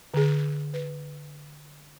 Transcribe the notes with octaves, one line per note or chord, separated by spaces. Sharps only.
D3 G#4
B4